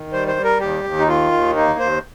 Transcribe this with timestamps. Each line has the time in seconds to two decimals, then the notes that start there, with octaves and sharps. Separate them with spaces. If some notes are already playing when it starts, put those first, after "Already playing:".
Already playing: D#3
0.13 G3 C5
0.28 C5
0.36 G3
0.44 A#4
0.60 D#2 G4
0.84 D#2
0.99 D#4
1.08 D#3 F4
1.32 D#2
1.55 A#3 D#4
1.80 D#2 C5